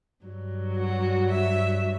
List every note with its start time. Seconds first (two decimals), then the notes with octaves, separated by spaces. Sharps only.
0.25 G2 F#3
0.78 F#4
1.31 E5